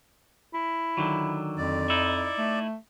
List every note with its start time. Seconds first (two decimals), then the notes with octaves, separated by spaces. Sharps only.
0.54 E4
0.97 D3 D#3 F#3
1.58 F2 D5
1.90 D#4 E4
2.38 A3